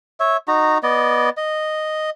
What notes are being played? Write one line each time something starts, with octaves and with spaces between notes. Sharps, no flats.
C#5 E5
D#4 F#4 A#5
B3 D5 D#5
D#5